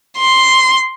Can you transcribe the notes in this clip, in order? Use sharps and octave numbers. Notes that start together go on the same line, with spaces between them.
C6